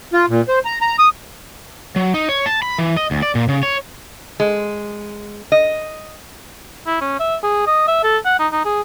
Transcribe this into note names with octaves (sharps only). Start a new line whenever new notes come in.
F4
A#2
C5
A#5
A#5
D#6
F#3
D#4
C#5
A5
B5
E3
D#5
D2
D5
A#2
C#3
C#5
G#3
D#5
E4
C#4
E5
G#4
D#5
E5
A4
F#5
D#4
D#4
G#4